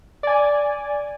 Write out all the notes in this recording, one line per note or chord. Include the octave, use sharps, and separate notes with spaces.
D5 G#5